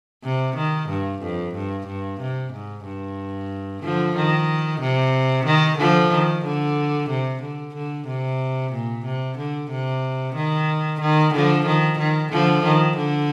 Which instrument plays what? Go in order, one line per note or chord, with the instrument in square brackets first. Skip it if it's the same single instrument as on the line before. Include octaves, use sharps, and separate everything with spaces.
[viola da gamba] C3
D#3
G2
F2
G2
G2
C3
G#2
G2
D3 F3
D#3
C3
D#3
D3 F3
D#3
D3
C3
D3
D3
C3
A#2
C3
D3
C3
D#3
D#3
D3 F3
D#3
D#3
D3 F3
D#3
D3